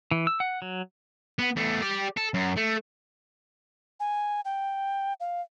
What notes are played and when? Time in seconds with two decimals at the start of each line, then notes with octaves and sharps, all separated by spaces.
0.11 E3
0.27 E6
0.40 F#5
0.62 F#3
1.39 B3
1.56 E2 A3
1.82 G4 D5
2.17 A4
2.34 F#2
2.57 A3
4.00 G#5
4.45 G5
5.20 F5